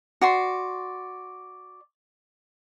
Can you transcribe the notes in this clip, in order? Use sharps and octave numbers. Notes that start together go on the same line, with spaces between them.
F#4 D5 C6